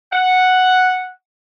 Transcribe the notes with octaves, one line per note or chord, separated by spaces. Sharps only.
F#5